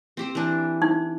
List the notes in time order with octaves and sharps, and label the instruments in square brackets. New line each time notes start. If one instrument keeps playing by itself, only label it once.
[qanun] C4 G4 C5
E3 D4
[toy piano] D#4